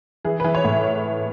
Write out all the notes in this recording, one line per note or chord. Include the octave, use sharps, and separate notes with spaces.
E3 G#4
E3 B4
C#5
A2